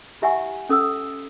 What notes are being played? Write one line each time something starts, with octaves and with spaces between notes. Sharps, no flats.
E4 G4 E5 F#5 G#5 C#6
C#4 A4 D#6 E6